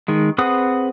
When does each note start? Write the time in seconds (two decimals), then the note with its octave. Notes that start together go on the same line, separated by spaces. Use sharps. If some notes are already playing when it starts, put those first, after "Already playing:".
0.08 D#3 G#3
0.38 C4 G#4 B4 F#5 D#6